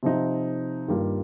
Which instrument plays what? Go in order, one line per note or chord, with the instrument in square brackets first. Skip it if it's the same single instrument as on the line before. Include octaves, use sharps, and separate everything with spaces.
[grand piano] C3 F3 C4 D#4
G2 D#3 G3 A#3 F4